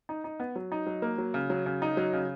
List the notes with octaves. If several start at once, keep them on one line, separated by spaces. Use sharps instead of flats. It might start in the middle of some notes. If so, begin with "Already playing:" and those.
D#4
D#4
B3
F#3
D#4
F#3
A#3
F#3
C#3
F#3
C#3
D#4
F#3
C#3